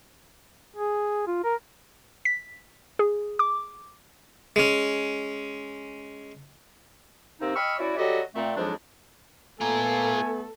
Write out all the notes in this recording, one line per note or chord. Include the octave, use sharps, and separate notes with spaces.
G#4
F4
A#4
B6
G#4
D6
G#3 C#4
C3 A#3 C4 D#4
D#5 G5 B5 C#6 E6 F6
C#4 E4 F#4 C#5 D5
F#3 G3 F#4 G4 A4 D#5
A#2 A3 C4
F2 G#2 F3 F#3 G#3 D4
A3 B3 F4 A4 A#4 G#5